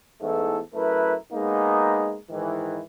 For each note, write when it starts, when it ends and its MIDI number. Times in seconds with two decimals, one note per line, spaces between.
0.22 0.58 40
0.22 0.58 44
0.22 0.58 52
0.22 0.58 57
0.22 0.58 69
0.75 1.14 42
0.75 1.14 57
0.75 1.14 64
0.75 1.14 70
0.75 1.14 71
1.33 2.16 56
1.33 2.16 58
1.33 2.16 59
1.33 2.16 63
2.30 2.79 44
2.30 2.79 51
2.30 2.79 52